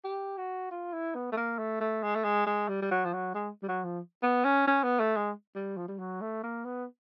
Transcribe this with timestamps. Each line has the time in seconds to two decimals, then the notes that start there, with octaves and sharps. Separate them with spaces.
0.05 G4
0.37 F#4
0.71 F4
0.93 E4
1.15 B3
1.32 A3
1.37 A#3
1.59 A3
1.80 A3
2.03 G#3
2.15 A3
2.24 G#3
2.47 G#3
2.69 G3
2.82 G3
2.91 F#3
3.05 F3
3.14 F#3
3.34 G#3
3.63 G3
3.68 F#3
3.84 F3
4.23 B3
4.45 C#4
4.67 C#4
4.83 B3
5.00 A3
5.16 G#3
5.55 G3
5.77 F3
5.88 G3
5.99 F#3
6.21 A3
6.43 A#3
6.65 B3